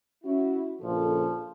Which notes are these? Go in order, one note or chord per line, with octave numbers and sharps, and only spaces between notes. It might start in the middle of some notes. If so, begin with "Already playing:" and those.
C#4 E4 F#4
A#1 C#3 F3 A4